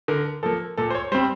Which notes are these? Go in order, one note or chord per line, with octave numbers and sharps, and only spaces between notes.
D3 A#4
F3 A#3 A4
A#2 A4
C5
C#5
G3 C4 C5